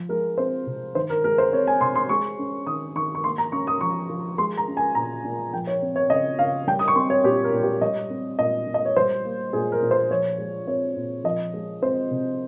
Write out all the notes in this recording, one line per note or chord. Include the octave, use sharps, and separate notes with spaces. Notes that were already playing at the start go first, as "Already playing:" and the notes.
Already playing: F3
G#3 A#4
C4 C5
C3
D#3 C5
A#4
G#3 A#4
C5
C4 C#5
G#5
C3 C6
C6
G#3 C#6
C#4
D#3 D#6
D#3 C#6
C#6
A#3 C6
A#5
C#4 C#6
D#6
F3 C#6
F3
G#3 C6
A#5
C#4
G#5
A#2 A#5
A#2
F3 G5
C#5
C4
C#5
C#3 D#5
C#3 F5
G3 G5
D#6
C#6
C4 C6
C#5
A#2 G4
A#4
A#2
G4
G3 D#5
C4
A#2 D#5
A#2
D#5
C#5
G3 C5
A#3
A#2 G#4
A#4
A#2
C5
F3 C#5
G#3
C4 C#5
A#2
F3 D#5
G#3
C4 C5
C3